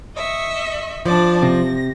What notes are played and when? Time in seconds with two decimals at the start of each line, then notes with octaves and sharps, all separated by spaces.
0.16 D#5 E5 C#6
1.06 F3 D4 D5
1.42 C3 A#6